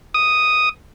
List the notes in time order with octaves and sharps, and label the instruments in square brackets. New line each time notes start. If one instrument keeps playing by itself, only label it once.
[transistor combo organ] D#6